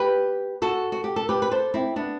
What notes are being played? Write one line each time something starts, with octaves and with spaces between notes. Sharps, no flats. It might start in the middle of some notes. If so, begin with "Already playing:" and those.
Already playing: G4 B4
F#4 A4
F#4
G4
A4
G4 B4
B4
A4 C5
C4 E4
B3 D4